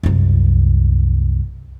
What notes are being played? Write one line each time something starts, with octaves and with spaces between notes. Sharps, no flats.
C2 F#2